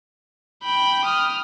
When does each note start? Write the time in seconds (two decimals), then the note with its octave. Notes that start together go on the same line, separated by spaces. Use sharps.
0.64 G5 B5
1.05 D#6 F6